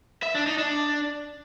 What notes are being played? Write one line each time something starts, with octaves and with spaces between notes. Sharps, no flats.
E5
D4
D#4
D4